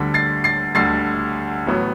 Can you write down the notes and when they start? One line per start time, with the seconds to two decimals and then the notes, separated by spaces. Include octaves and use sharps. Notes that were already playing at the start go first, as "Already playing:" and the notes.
Already playing: D2 D3 G3 B6
0.14 A6 C7
0.44 A6 C7
0.75 D2 D3 G3 A6 C7
1.67 A1 A2 F#3 B3